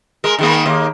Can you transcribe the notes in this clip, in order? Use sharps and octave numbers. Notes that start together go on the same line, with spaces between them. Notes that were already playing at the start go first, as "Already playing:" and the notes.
G#3 A#4
D#3 G#3 A#3
D#2 A#3